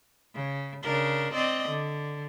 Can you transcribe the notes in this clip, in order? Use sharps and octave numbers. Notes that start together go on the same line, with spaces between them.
C#3
C#3 D4 A#4
C4 D5 D#5
D3